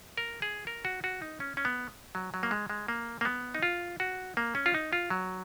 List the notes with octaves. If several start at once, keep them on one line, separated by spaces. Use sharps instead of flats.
A#4
G#4
A#4
F#4
F#4
D#4
C#4
C#4
B3
F#3
F#3
A#3
G#3
G#3
A#3
A#3
B3
D#4
F4
F#4
A#3
C#4
F4
D#4
F4
F#3